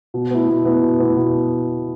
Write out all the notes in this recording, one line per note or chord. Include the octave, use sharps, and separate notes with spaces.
B2
B3 E4
B2
B3 E4
B2
B3 E4
B2